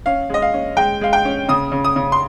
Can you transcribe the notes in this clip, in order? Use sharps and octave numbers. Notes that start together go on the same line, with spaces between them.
C#4 F5
G#3 D#5
F5
C#4
G#3 G5
G#3 F5
G5
C#4
C#3 D#6
C#3
D#6
C#3
C6